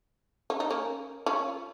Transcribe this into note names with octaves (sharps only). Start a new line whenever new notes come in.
C#4
D#4
A#3 C#4
C#4 F4